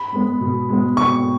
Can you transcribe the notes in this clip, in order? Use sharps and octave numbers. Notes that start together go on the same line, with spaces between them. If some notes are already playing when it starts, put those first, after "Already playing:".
Already playing: B5
G#3 B3
B2
G#3 B3
B2 C#6